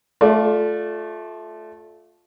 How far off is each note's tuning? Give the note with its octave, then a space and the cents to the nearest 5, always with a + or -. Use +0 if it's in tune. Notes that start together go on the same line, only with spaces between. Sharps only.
A3 -15 F4 +15 D5 +0